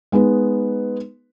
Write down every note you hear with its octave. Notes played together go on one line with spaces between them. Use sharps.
G#3 B3 D#4 B4